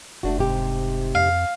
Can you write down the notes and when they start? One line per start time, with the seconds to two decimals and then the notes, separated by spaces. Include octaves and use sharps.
0.23 F1 A3 D4 F#4
0.38 G#2 C3 G4
1.15 F2 F5